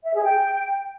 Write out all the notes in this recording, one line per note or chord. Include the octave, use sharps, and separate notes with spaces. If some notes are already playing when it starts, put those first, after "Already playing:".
E5
G#4
G5